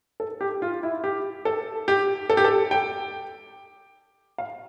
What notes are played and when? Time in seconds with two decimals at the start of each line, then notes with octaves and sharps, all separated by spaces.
0.20 A4
0.41 G4
0.62 F4
0.83 E4
1.04 G4
1.45 A4
1.88 G4
2.30 A4
2.37 G4
2.44 A4
2.71 G5
4.38 F5